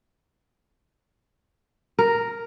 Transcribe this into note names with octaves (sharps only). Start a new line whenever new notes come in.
A#4